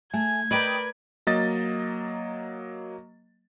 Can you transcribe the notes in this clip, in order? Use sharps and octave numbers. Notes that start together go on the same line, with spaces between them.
A3 G#5 G#6
A#4 B4 D5 D#5 G5 B5
F#3 A#3 D#5 A6